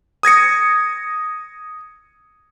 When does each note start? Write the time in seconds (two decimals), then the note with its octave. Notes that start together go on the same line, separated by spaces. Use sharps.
0.23 D#6 G#6 A#6 C#7